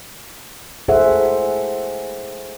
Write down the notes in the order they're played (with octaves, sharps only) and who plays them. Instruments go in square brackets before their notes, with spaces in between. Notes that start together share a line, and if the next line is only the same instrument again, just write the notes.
[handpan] E4 G#4 A4 C5 E5 F#5